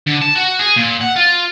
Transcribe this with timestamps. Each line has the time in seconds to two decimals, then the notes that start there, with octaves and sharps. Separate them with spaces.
0.07 D3
0.22 A5
0.35 F#4
0.59 G#4
0.76 A#2
1.01 F#5
1.16 F4